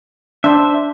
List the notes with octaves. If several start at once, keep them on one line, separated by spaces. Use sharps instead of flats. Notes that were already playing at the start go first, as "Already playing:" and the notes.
D4 C5 E5